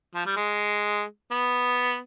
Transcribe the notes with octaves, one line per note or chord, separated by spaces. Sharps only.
F3
G3
G#3
B3